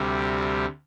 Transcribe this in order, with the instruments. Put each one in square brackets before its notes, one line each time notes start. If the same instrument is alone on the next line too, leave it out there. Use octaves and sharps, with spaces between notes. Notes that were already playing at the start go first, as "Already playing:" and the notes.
Already playing: [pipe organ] D2 C3 G3